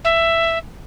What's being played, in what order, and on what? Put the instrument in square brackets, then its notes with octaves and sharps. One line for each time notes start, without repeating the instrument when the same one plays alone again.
[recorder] E5